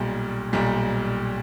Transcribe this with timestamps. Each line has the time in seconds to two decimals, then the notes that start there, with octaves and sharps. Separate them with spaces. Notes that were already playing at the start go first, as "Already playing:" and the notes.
Already playing: B1 A#2 G3
0.53 B1 A#2 G3